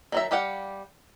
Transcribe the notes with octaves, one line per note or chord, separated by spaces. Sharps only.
D#3 F#3 E5
G3 G4 F5 F#5